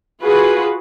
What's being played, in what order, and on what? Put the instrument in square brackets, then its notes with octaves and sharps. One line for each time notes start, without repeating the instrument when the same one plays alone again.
[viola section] F4 F#4 G#4 B4